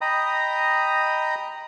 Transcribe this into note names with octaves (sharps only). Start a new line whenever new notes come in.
D#5 G5 A#5 B5 D#6